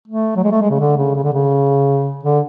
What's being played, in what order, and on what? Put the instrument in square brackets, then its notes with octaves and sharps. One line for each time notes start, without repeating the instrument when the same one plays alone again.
[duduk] A3
F#3
G#3
A3
G#3
C#3
D3
C#3
C#3
D3
C#3
D3